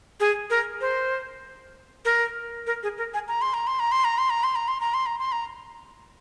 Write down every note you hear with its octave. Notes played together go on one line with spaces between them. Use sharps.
G#4
A#4
C5
A#4
A#4
G#4
A#4
G#5
A#5
C6
A#5
C6
A#5
C6
A#5
C6
A#5
C6
A#5
C6
A#5
C6
A#5
C6
A#5